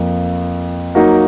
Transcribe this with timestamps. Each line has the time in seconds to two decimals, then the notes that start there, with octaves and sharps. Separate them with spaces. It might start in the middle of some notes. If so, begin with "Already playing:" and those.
Already playing: F2 F3 A#3
0.95 F#3 A#3 D#4 F#4 A#4